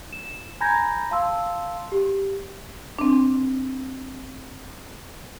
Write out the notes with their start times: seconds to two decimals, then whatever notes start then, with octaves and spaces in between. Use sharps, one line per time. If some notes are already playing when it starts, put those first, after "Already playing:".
0.13 E7
0.61 G#5 A#5 B5 G6 G#6 A#6
1.11 F5 A5 C6 E6
1.92 G4
2.99 C4 D4